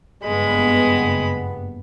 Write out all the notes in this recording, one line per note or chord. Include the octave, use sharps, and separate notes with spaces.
F#1 G2 G#3 B3 B5